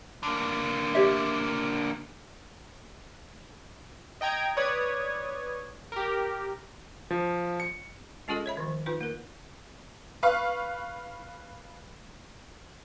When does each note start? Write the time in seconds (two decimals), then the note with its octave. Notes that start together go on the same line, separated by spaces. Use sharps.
0.23 D3 A#3
0.95 G4 C#5 E5
4.21 D#5 G5 A#5 G#6 D7
4.57 B4 C#5 D5 D#6 G#6
5.92 G4 A#4
7.10 F3
7.60 C#7
8.28 G#3 C#4 F4 G#4 A4 D#5
8.46 C#5 E5 B5
8.57 D#3 F3
8.86 D#4 F4 B4
9.01 A#3 A#4
10.23 B4 F5 C#6